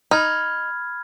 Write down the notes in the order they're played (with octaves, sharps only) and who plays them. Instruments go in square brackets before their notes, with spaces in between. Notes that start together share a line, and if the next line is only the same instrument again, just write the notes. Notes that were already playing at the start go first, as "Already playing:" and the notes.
[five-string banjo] D#4 [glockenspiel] B5 F6 G#6